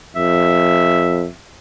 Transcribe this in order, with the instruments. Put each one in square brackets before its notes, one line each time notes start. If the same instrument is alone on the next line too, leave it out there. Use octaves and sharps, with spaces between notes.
[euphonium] F2 [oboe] E5